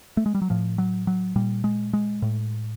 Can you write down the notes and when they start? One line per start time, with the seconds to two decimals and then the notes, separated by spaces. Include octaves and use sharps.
0.17 A3
0.26 G#3
0.35 G3
0.42 F#3
0.50 A2 F3
0.78 F#3
1.07 F#3
1.36 A#2 G3
1.64 G#3
1.93 G#3
2.22 A2